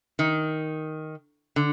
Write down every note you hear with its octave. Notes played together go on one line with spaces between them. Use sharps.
D#3
D3